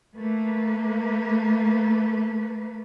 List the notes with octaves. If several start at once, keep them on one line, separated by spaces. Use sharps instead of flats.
A3 A#3 B4